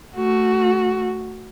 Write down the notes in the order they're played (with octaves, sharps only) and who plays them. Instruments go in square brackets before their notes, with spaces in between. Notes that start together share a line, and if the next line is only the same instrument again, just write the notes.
[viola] A3 F#4